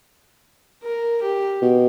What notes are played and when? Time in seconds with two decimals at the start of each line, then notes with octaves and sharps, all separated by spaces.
0.83 A#4
1.22 G4
1.62 B2